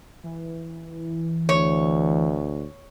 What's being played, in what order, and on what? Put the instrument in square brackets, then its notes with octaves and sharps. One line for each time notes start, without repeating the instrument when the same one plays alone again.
[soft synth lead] E3
[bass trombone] D2 [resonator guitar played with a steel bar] C#5